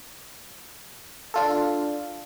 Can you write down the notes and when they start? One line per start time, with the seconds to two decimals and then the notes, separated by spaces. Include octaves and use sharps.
1.34 D4 F4 A4